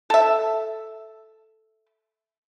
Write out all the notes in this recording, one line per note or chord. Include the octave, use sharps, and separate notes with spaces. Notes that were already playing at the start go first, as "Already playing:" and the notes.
A4 E5